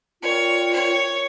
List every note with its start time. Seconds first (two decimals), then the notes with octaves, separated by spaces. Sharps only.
0.23 F4 A#4 C#5 D5 G5
0.73 C#5